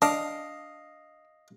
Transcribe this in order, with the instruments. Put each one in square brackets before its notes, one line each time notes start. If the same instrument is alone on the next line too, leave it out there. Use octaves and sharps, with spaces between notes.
[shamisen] D4 [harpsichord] D#5 F5